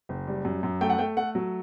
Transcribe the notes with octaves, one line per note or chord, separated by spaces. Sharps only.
F#1
G3
F#2
F#2
A3 G5
F#5
A3 G5
A3 F#5
F#3